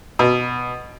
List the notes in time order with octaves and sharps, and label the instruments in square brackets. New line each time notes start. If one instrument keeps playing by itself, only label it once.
[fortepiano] B2